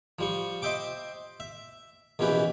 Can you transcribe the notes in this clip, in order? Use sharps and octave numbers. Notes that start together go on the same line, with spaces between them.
F3 G3 C#6
C5 D#5 E5 G5 D6
E5
A#1 B2 E3 C#4 G4 B4